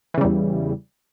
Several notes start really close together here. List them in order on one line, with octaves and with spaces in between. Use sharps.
E3 C#3 G3 E2